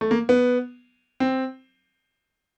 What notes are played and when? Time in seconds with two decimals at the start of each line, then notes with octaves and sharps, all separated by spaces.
0.01 A3
0.11 A#3
0.29 B3
1.20 C4